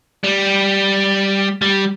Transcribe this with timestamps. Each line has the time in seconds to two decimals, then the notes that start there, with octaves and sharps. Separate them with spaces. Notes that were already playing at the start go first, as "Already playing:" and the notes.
0.24 G3
1.62 G3